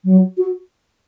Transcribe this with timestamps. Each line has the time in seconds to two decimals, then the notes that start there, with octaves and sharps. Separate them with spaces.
0.05 F#3
0.37 F#4